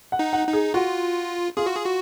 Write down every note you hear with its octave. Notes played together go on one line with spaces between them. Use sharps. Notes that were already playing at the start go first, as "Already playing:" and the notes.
F#5
D#4
F#5
D#4
G#4
F4 F#4
F4 G#4
F#4
G#4
F#4